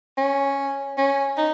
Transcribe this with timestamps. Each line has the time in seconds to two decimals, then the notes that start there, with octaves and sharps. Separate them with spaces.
0.17 C#4
0.98 C#4
1.38 D#4